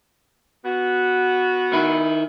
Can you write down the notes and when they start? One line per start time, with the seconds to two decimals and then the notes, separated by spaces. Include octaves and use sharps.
0.64 B3 F#4
1.73 D#3 E4